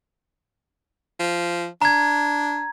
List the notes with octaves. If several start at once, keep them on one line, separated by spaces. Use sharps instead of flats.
F3
D4 A#5 G#6